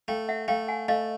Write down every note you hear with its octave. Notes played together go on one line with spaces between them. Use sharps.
A3 F5 G5
E5 F#5
A3 F5 G5
F#5 G#5
A3 D#5 F5